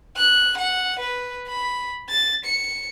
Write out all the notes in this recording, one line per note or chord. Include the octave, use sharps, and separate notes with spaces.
F#6
F#5
B4
B5
A6
C#7